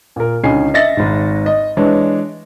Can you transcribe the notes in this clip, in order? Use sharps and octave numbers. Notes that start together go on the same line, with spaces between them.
A#2 A#4
C#2 D3 C#4 D#4 G#5 C7
D#5 E5 A6 A#6 C#7
G#1 G#2
D#5
E3 G#3 D4 C#5